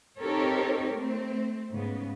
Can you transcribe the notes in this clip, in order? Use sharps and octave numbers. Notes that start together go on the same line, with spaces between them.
C4 D#4 G4 A4 A#4 C#5
A3 C4
G#2 C#3 B3